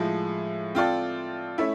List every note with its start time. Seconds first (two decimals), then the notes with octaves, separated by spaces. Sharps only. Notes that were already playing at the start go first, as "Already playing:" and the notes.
Already playing: A2 F3 G#3
0.75 C4 F4 A4 D5
1.58 A3 C#4 E4